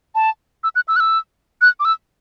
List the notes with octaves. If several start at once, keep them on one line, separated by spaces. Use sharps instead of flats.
A5
E6
F#6
E6
F#6
E6
F#6
D6
E6